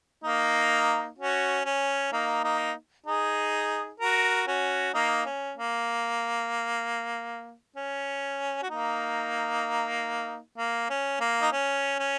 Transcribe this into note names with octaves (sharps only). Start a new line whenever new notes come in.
A#3 D#4
C#4 F#4
C#4
A#3 D#4
A#3 D#4
D#4 G#4
F#4 A#4
C#4 F#4
A#3 D#4
C#4
A#3
C#4
F#4
A#3 D#4
A#3
C#4
A#3
D#4
C#4
C#4